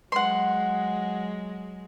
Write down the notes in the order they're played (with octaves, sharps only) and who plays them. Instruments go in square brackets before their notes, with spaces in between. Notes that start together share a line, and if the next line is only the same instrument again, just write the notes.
[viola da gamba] F#3 G#3 [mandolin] F#5 C6